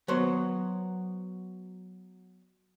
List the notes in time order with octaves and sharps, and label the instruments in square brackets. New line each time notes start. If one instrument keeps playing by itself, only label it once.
[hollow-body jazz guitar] F#3 B3 C5 C#5